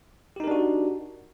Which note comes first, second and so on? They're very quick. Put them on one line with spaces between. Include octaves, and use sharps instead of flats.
G4 D#4 A#4 D4 F#4